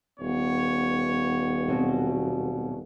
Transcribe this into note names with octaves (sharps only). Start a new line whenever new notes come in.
D#1 B3 C#5
B2 F#3 C4